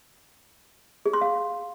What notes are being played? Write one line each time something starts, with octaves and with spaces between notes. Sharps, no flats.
G#4
C6
F5